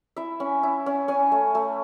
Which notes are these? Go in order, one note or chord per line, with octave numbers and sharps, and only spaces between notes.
E4 E5
C#4
E4
C#4
C#4 G#5
A3
A3